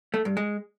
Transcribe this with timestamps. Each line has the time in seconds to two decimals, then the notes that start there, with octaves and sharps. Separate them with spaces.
0.14 A3
0.25 G2
0.37 G#3